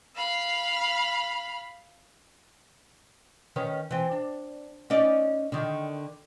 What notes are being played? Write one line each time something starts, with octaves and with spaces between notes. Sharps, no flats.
F5 B5
D#3 C#4 B4
E3 C4
D4
C#4 D#4 D5
D3 D#3